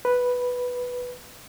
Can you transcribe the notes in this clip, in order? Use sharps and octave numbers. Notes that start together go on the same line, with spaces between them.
B4